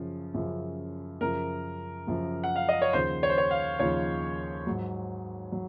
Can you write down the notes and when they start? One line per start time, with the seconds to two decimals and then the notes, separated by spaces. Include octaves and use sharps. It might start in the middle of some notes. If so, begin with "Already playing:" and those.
Already playing: F#2 C#3 F3
0.34 F#2 C#3 F3
1.21 F#2 C#3 F3 A#4
2.07 F#2 C#3 F3
2.44 F#5
2.56 F5
2.69 D#5
2.82 C#5
2.93 D#2 C#3 F3 C5
3.23 C#5
3.30 C5
3.38 C#5
3.51 F5
3.79 D#2 C#3 F3 C#5
4.67 G#2 F#3
5.52 F#3